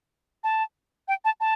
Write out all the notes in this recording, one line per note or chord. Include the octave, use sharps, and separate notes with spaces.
A5
G5
A5
A5